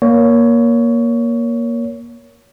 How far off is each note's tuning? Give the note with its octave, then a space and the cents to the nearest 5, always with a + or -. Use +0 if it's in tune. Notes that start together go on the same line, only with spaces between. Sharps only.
A#3 +15 C#5 +20